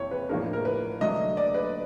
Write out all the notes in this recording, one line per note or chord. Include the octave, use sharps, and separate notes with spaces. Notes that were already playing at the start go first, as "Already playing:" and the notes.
Already playing: F2 C3 E3 C#5
B4
A2 F3 A#3 D4 A#4
A#4
B4
D3 F#3 A3 D4 D#5
D5
B4